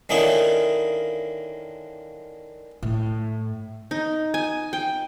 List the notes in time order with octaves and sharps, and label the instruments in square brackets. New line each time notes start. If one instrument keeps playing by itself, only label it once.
[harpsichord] D3 D#3 A#3 C#4 D#4 E4
[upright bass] A2
[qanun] D#4
G#5
G5